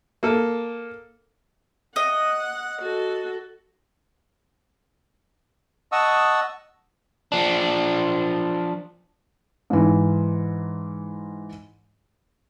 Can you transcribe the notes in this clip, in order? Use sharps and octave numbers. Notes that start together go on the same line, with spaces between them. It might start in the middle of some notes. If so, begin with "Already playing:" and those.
A#3 A4
D#5 F#5
F#4 A4
D#5 F#5 A5 C#6 D#6 E6
F3 D4
G#2 E3